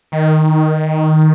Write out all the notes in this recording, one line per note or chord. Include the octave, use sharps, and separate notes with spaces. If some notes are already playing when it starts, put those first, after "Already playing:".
D#3